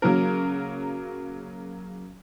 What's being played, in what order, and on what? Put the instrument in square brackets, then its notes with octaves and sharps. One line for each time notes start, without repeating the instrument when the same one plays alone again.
[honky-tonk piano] C#3 F#3 A#3 A#4